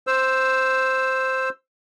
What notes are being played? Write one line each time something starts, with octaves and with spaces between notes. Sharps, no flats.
C5 E6